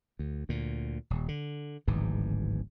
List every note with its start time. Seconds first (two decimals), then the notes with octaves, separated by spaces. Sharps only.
0.19 D2
0.49 D2 A#2
1.10 D#1
1.28 D3
1.87 D1 G#1 G#2 E3